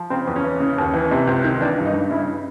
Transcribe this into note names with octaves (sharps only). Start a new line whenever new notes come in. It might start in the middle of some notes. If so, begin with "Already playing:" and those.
Already playing: F3
C#3 C4
E2
C#4
E3
C#3
D#2
E3
C3
C#2
D#3
E3 D4
G2
D#4
G2
C#3 E4